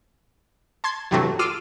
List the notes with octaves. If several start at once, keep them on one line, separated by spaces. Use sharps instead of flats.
A5 C6 G#6
E2 G2 C3 F#3 A3
F4 D6 E6 F6 D#7